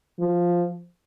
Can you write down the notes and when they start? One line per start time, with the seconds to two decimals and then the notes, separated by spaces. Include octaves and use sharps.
0.20 F3